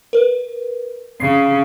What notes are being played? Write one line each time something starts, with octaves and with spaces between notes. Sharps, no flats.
A#4 B4
C#3 C7